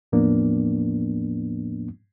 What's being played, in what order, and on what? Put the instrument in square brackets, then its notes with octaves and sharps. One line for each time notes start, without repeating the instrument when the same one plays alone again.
[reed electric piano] E2 A2 F3 A#3 B3 D4